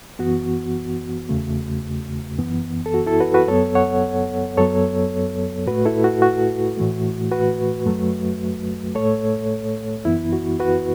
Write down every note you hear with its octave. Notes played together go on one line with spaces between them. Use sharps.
F#2 E3 B3 F#4
E2 C#3 A3
F#2 E3 B3
A4
F#4
E4 A4
F#4 B4
F#4 B4
F#2 F#3 B3 A4 C#5
C#5 F#5
F#2 F#3 B3 A4 C#5
A2 A3 F#4 B4
E4 A4
F#4
F#4
A2 E3 A3
F#4 B4
F#2 F#3 A3
A2 A3 A4 C#5
F#2 E3 B3 E4
F#4
F#4 B4